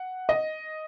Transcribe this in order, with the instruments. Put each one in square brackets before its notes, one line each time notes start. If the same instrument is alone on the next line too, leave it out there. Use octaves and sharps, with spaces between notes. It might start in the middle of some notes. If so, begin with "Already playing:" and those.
Already playing: [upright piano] F#5
D#5